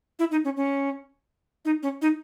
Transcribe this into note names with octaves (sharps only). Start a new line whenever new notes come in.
E4
D#4
C#4
C#4
D#4
C#4
D#4